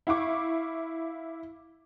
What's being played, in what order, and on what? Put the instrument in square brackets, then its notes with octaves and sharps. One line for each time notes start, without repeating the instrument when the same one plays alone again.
[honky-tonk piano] E4 F5 C#6 D6